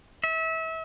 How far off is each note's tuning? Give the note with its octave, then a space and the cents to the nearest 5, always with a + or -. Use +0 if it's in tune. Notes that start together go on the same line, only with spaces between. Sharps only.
E5 -30